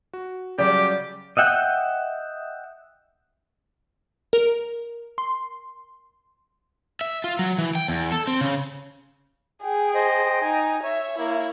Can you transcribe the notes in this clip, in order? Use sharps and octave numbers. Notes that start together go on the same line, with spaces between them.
F#4
C#3 F#3 G3 G4 D5
D#5 E5 F#5 G5
A#4
C6
E5
F4
F#3
E3
G5
E2
A4
C4
C#3
G#4 G5
C5 D#5
D#4 G#5
C#5 E5
A#3 E4